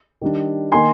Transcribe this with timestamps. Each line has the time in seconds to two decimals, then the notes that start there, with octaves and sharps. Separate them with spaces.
0.21 D#3 G3 D4
0.72 D#3 A#3 D#4 G#5 C6